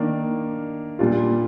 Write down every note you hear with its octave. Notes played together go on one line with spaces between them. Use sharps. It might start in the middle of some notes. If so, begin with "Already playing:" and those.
Already playing: D#3 A#3 D4
A#2 G3 D4 F4